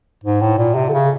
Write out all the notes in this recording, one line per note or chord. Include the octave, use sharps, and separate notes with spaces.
G#2
A2
A#2
C3
D3
C#3